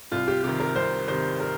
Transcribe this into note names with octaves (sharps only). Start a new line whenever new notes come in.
C2 F4
G4
C3 D#3 G4
A#4
C2 C5
C3 D#3 C5
A#4